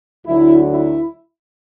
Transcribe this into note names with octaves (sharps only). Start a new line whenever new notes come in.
D2 D3 F#3 E4
E4